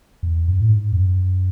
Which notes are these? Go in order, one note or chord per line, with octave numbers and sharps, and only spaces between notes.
E2
F#2
A2
G#2
E2
F#2